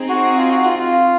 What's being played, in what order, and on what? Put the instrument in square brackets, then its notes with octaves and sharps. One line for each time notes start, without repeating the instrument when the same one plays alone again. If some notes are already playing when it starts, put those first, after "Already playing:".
Already playing: [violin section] C4 D#4 G#4
[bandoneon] F#4
F4
F#4
F4
F4